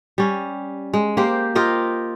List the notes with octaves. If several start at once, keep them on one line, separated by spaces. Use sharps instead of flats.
G3 C#4
G#3
A#3 G4 C5
F4 G4 A#4 D#5